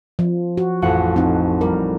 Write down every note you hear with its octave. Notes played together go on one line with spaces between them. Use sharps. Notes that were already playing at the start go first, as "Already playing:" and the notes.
F3
F#4
A1 F2 F#5
C4 D#4
G3 A#4